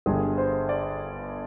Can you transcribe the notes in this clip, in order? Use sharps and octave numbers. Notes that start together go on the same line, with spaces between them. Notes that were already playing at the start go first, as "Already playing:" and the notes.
G1 G2 D3 G3 G#4
C5
D5